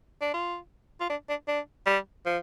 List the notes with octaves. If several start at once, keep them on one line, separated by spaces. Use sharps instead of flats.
D4
F4
F4
D4
D4
D4
G3
F3